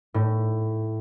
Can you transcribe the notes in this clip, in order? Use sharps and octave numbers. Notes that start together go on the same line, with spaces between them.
A2